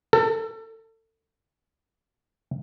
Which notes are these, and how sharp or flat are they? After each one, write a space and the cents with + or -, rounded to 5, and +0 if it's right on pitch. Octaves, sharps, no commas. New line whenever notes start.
A4 +30